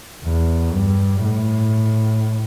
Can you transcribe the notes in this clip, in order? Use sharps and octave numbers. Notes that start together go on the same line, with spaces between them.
E2
G2
A2